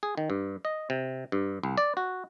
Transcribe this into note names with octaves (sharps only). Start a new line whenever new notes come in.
G#4
D#3
G2
D#5
C3
G2
C2
D5
F#4